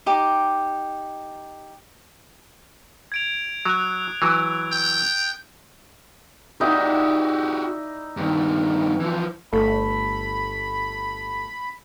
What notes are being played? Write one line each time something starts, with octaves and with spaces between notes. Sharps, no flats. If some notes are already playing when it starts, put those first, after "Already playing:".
D#4 G4 D6
G#6 D7 F7
F#3 D#6 F#6
E3 F#3
G5
D#4 E4 F#4 G4 D5
G2 D#3
E3 F3
G1 A3 B5